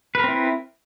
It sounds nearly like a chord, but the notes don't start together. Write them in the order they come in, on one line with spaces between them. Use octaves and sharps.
B4 A#4 C4 E4